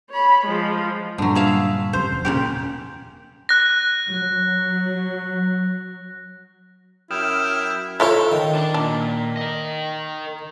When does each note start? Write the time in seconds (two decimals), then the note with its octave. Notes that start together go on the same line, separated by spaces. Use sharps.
0.10 C#5 B5
0.46 F3 G#3
1.18 G2 A#2 D3 F#3
1.35 G#4 E5 F5
1.93 D1 F#2 C3 C5
2.10 E1
2.25 A#2 C#3 G4
3.49 F#6 A#6
4.10 F#3
7.11 F#2 E4 G5 D#6 F6 E7
8.00 A3 E4 F4 A4 C#5
8.32 D#3
8.55 D4 D5
8.74 A#2 D4
9.37 A#4 D#5